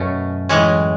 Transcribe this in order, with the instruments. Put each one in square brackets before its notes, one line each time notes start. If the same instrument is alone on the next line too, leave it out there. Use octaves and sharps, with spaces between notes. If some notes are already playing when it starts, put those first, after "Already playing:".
Already playing: [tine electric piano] F#2 F#3 [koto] B2 A3 C#4
[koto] A2 E3 G#3 C#4